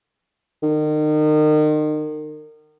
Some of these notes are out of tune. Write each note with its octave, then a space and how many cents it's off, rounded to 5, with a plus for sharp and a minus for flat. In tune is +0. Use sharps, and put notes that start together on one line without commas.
D#3 -35